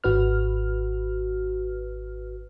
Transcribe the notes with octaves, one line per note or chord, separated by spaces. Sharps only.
G#1 F#4 B4 F6